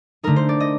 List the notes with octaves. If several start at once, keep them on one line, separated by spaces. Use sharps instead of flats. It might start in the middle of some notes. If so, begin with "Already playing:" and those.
D3 A3 D#4 A#4
C5
D5
D#5